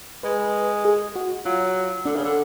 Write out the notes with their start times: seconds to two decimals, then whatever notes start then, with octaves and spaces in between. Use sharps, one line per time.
0.23 G#3 B4
0.85 G#4
1.16 F#4
1.45 F#3 F4
2.05 D3 D4
2.16 C#3
2.25 D3